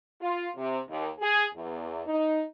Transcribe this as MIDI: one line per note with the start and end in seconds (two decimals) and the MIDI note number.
0.21 0.48 65
0.56 0.79 48
0.89 1.08 39
1.21 1.45 68
1.54 2.03 40
2.05 2.42 63